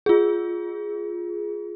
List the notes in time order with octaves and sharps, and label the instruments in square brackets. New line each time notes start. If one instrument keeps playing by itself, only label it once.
[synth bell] F4 G#4